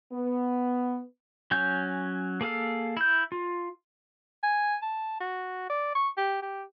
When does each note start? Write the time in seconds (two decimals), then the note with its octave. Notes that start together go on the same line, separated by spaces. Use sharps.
0.13 B3
1.51 F#3 C#4 G#5 G6
2.41 A#3 G#4 A4 F5
2.97 E4 G6
3.32 F4
4.43 G#5
4.82 A5
5.20 F#4
5.70 D5
5.95 C#6
6.17 G4
6.42 G4